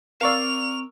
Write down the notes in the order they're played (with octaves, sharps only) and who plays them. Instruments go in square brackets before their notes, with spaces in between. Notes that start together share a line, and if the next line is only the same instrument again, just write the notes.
[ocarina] C4 [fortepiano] A#4 C#6 E6 [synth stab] D5 F5 [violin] F7